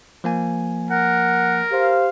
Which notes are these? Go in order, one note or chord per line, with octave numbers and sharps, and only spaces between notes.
F3 A#3 G#5
A#4 F#5
G4 C5 F5